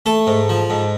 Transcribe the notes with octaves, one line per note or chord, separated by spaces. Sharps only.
A3 A4
G#2
F3
G#2